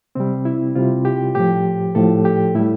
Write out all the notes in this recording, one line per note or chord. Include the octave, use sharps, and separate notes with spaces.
C3 G3 C4
E4
C3 G3 F4
G4
A2 F3 G4
A2 F3 A4
G4
A2 G3 E4